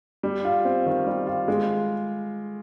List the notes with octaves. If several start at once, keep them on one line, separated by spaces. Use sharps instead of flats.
G3
F4
C4
D#3
G3
F4
G#3